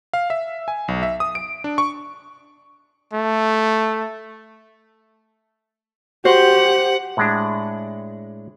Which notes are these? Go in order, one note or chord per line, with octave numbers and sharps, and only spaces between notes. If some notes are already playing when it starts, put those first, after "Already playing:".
F5
E5
G#5
B1
E5
D#6
D7
D4
C#6
A3
F#4 G4 C5 F#5
A2 G#3 D4